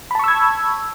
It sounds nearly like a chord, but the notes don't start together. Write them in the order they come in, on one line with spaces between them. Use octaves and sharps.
B5 A5 C#6 E6 G#6